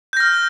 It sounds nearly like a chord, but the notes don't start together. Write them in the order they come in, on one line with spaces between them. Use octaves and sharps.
G6 A#6 F6